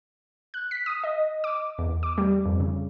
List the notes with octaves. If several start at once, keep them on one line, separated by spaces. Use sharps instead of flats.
F#6
B6
D#6
D#5
D6
E2
D6
G3
F2
C#3